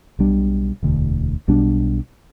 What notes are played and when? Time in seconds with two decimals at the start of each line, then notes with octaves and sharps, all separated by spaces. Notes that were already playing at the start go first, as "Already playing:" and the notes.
0.19 B1 B2 G3 D4
0.83 E1 D2 D3
1.48 B1 B2 G3 D4